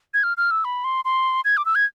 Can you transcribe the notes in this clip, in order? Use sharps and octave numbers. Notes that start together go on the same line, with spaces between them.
G#6
F6
F6
E6
B5
C6
C6
G#6
D6
E6
G#6